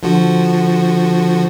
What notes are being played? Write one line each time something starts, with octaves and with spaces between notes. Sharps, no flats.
D3 F3 F#4